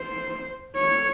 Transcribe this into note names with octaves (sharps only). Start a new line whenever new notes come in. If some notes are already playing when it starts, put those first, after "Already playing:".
Already playing: C5
C#5